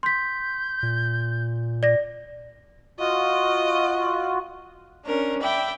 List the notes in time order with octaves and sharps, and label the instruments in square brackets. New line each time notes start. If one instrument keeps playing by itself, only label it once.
[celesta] C6 B6 [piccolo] G6
[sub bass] A#2
[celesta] D5 A#6
[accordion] F4 F#4 [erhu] D#5
[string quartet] C#4 D4 A#4
D5 E5 G5 B5